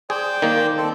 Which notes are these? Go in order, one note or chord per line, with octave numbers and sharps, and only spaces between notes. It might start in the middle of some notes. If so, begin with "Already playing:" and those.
G#4 C5 D5 G5
D#3 A#3
C4 A4